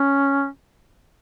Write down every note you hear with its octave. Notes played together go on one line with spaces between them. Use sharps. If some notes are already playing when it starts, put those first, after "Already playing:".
Already playing: C#4